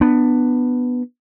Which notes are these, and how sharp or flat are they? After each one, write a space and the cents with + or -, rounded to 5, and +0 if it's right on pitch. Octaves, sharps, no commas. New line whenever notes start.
B3 +0 D4 +20